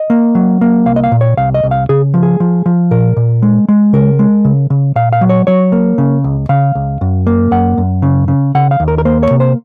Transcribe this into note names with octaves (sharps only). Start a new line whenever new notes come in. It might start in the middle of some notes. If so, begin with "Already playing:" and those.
Already playing: D#5
A#3
F#3
A#3
C2 F5
D#5
F5
A#2
C#5
C2 F5
D#5
C2
F5
C#3 G#4
F3
G#4
F3
F3
A#2 A#4
A#2
G#3
G#3
C#3 A#4
G#3
C#3
C#3
A#2 F5
F5
F#3
C#5
F#3 C#5
A#3
C#3
C#2
C#3 F5
C#2
F#2
A#3
F#2 F#5
F#2
C#3
C#3
C#3 F#5
F5
D#2
A#4
A#4
A#3 C5
C#5
C3
C5